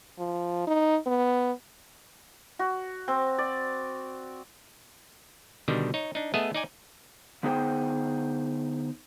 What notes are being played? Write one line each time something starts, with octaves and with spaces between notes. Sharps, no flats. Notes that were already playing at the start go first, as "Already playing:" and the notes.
F3
D#4
B3
F#4
C4
D5
B2 D3 D#3 G3
D#4 C#5
D4 D#4
A3 B3 G#4 D#5 E5 A5
D#4 D5 G#5
D3 B3 D#4 G#4 C5 G5